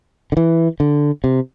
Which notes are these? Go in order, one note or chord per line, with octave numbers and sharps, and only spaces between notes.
D3
E3
D3
C3